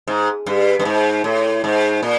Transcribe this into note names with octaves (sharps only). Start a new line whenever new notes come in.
G#2
G2
G2
G#2
A2
G#2
A#2